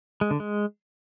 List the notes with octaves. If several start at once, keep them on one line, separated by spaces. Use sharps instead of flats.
G#3
D3
G#3